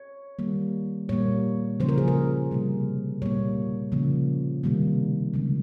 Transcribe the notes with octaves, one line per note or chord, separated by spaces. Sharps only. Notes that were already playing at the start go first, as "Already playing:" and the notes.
Already playing: C#5
D#3 G3 A#3
A#2 G3 A#3 C#5
C#3 F3 A#3 C5
A#4
G#4
A#4
C3 G3 A#3
A#2 G3 A#3 C#5
C#3 F3 A#3
C3 D#3 G3 A#3
C#3 F3 G#3